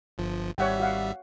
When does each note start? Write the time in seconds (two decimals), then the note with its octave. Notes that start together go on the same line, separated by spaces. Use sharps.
0.18 G1 F3
0.58 G#1 G3 C#5 E5 F#5 G5
0.80 F#4 F5 F#5